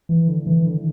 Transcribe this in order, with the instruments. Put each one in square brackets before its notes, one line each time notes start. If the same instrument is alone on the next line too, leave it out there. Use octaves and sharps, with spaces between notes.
[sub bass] E3
D3
E3
D3